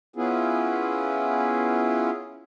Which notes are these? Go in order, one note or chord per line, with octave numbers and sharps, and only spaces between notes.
B3 C#4 E4 F4 G#4